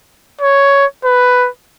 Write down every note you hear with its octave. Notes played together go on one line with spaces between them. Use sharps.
C#5
B4